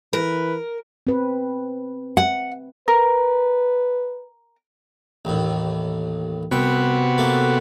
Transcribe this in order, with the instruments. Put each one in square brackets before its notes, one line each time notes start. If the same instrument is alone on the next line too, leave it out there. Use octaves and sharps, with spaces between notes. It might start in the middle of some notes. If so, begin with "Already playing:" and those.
[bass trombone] E3 [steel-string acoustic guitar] A#4 [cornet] B4
[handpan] C4 B4
[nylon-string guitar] F#5
[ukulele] A#4 [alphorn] B4
[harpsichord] A1 D#2 A2
[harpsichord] C2 G5 [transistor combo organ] C3 B3 F#4
[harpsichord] A3 A#3